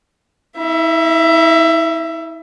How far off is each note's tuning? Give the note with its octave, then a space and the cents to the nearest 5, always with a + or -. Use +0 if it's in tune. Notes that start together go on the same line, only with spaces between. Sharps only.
E4 -35 E5 +20